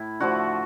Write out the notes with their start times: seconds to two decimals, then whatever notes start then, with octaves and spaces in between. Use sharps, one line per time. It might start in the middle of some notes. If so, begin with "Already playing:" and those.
Already playing: A2 E4
0.20 D3 F3 A3 F#4